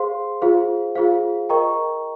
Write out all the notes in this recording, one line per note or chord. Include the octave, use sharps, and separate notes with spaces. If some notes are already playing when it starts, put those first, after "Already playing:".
Already playing: G#4 C5 F5 C6
F4 G#4 C5 F5
F4 G#4 C5 F5
A#4 D#5 G5 A#5 C#6